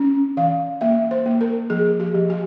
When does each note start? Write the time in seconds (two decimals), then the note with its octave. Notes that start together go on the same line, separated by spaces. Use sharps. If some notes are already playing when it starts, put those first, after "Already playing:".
Already playing: C#4
0.37 E3 F5
0.81 A#3 E5
1.11 C5
1.26 A#3
1.41 A#4
1.70 F3 G#4
2.00 G4
2.15 F3
2.30 G4